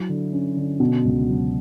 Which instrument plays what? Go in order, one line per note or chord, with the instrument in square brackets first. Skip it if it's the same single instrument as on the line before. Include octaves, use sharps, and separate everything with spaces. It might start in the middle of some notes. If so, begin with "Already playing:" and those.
Already playing: [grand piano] F#3 E4
D3
C#4
D3
B2
C#2
F#3